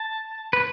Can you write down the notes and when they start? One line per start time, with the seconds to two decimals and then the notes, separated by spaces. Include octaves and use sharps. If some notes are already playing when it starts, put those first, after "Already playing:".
Already playing: A5
0.53 B4